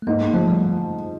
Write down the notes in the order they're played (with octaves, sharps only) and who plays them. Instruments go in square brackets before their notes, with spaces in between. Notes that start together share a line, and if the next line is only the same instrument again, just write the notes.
[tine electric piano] A3
[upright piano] G#2 [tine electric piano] A#3
[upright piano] F3 [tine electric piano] A3
[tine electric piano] G3